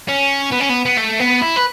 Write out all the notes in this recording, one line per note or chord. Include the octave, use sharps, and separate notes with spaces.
C#4
B3
C#4
B3
B3
A3
B3
E4
B4